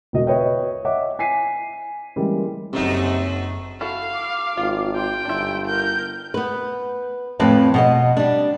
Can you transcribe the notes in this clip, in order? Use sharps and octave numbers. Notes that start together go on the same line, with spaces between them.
E1 B2 F#4 D#5
B4 C#5 D#5 E5 G5
C#5 D#5 E5 F#5 D6
G#5 B6 C7 D#7
E3 G3 G#3 A#3 C#4
F#1 F#2 C3 A3 D#4
E4 F#4 A4 F5
D6
G#1 F4
G5 C6
G1 D4 E4
A#4 G6
B3 B4
F2 A2 C4 B4 A5
B2 D5 D#5
G3 D4